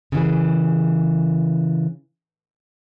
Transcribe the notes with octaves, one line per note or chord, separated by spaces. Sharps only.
C#3 E3 G#4